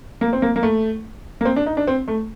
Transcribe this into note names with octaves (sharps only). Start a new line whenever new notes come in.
A#3
C4
A#3
A#3
A3
A#3
C4
D4
D#4
D4
C4
A3